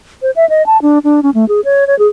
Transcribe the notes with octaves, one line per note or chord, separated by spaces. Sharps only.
C5
E5
D#5
A5
D4
D4
C#4
A3
G#4
C#5
C#5
G#4